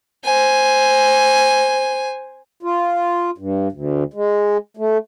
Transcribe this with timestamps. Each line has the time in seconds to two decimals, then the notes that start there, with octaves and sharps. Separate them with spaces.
0.24 C5 G#5
2.63 F4
3.38 G2
3.72 D2
4.14 G#3
4.77 A3